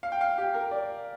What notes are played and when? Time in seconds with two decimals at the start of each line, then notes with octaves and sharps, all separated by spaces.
0.03 F5
0.12 G5
0.21 F5
0.38 G4
0.54 A#4
0.71 D5